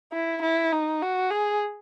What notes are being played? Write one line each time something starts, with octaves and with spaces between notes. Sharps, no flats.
E4
E4
D#4
F#4
G#4